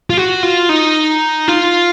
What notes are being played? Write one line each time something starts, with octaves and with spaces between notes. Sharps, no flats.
F4
F#4
F4
D#4
F4